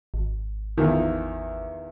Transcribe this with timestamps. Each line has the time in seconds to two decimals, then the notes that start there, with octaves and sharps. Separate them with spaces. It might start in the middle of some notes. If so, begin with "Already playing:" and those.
0.14 G#1
0.77 E2 D#3 F3